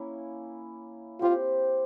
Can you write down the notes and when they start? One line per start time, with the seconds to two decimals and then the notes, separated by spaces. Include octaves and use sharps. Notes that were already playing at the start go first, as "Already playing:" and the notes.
Already playing: A#3 C#4 E4
1.21 C4 F4 G4 C5